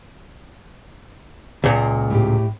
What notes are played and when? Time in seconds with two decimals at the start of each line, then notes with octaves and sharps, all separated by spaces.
1.64 C#2 A#2
2.10 A2 G4